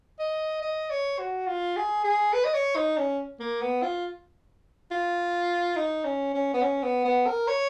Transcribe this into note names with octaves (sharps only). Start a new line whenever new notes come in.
D#5
D#5
C#5
F#4
F4
G#4
G#4
B4
D#5
C#5
D#4
C#4
A#3
B3
F4
F4
D#4
C#4
C#4
B3
C#4
B3
B3
A#4
C#5